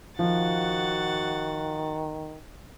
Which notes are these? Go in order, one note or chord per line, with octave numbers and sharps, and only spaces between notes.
D#3 F3 F#4 F#5 A6